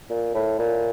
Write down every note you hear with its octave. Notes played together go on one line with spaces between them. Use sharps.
A#2
A2
A#2